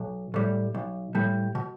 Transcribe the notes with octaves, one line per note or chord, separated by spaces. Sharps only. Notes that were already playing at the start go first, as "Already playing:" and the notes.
Already playing: B1
A2 G3
B1
A2 G3
B2